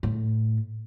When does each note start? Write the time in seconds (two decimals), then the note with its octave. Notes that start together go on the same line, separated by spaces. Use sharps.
0.03 A2